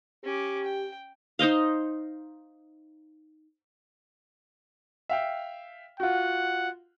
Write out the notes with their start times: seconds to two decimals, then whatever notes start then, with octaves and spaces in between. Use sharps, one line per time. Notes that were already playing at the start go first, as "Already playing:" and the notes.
0.24 C#4 G4 D6
0.64 G5
1.39 D#4 C5 D#5 F5
5.09 E5 F5 G5
6.00 F4 F#4 F#5